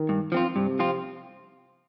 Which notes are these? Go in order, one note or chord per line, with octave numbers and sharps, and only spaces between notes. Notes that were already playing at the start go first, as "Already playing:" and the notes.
Already playing: D#3
G2
F3 C4 F4
G2 C3
F3 C4 F4